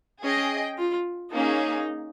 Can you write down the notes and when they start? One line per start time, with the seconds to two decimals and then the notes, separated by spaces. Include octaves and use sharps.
0.23 C#4 G#4 D#5 G5
0.78 F4
1.32 A#3 C#4 D#4 G#4